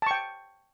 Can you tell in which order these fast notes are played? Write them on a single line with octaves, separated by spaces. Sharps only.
A5 C#6 G5